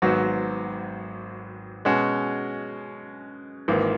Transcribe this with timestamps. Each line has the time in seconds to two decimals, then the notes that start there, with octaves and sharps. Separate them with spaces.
0.02 G#1 G#2 F#3 B3 F#4
1.85 B2 G#3 C#4 F#4
3.68 G#1 G#2 E3 A#3